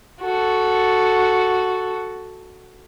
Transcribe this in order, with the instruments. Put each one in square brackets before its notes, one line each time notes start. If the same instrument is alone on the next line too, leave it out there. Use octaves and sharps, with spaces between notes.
[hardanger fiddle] F#4 A4